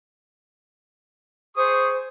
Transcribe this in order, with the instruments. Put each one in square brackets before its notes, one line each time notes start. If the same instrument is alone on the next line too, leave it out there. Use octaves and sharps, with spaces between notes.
[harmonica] G#4 C#6 D#6 [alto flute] C5